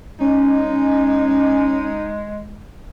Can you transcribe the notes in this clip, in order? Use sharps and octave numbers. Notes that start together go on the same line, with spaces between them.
G#3 C#4 D#4